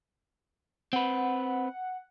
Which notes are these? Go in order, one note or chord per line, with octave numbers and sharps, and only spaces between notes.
C4 B4 F#5